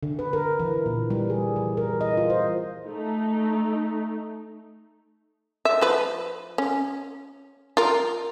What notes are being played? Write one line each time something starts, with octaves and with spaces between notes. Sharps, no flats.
D3
B4
A#4
E3
A#2
G3
G#4
E3
A#4
D#5
F4
C5
A3 D#4
E5
F3 B4
C#4
F4 A#4